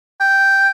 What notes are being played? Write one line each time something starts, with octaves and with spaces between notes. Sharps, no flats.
G5